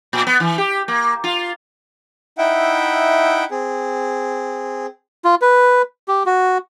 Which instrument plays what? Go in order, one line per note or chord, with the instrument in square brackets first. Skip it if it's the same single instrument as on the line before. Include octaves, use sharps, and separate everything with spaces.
[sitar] A#2
B3
E3
G4
A#3
F4
[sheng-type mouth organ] D#4 E4 E5 F#5 G5
C4 G#4
[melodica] F4
B4
G4
F#4